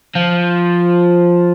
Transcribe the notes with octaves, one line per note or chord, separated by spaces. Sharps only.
F3